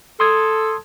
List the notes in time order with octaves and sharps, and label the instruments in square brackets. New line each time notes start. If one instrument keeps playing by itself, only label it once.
[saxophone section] A4 [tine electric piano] C6 D#6 G#6